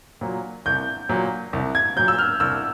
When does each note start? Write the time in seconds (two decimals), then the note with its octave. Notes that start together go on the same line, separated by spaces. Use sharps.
0.21 A#2 F#3
0.66 C2 G6
1.09 A#2 F#3
1.53 C2
1.75 G#6
1.97 A#2 F#3 G6
2.08 E6
2.19 F6
2.40 C2 E6